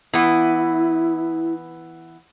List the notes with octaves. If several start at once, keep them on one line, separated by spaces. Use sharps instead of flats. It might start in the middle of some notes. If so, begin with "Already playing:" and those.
E3 B3 E4